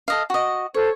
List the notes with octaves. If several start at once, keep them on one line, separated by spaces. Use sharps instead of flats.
A4 D#5 F5
F#4 D#5
A4 C5 C#5